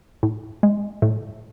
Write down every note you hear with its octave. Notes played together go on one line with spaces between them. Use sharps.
A2
G#3
A2